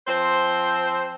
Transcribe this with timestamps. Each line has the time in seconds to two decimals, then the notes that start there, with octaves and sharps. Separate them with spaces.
0.07 F3 C4 C5